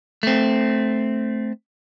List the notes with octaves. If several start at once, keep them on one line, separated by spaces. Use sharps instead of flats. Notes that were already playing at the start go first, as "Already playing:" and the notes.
A3 C4